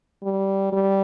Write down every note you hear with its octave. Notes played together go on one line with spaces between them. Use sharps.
G3
G3